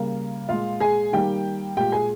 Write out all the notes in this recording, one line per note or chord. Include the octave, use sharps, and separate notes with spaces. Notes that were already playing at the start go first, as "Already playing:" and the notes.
Already playing: C#3 G3 A#3
A#2 G#3 F4 F5
G#4 G#5
D#3 G3 A#3 G4 G5
A#2 G#3 G4 G5
G#4 G#5